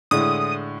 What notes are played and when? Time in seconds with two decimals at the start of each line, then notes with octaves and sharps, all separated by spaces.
0.11 A2 D3 G#3 D#6